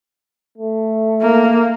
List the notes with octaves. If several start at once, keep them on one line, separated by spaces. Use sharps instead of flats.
A3
A#3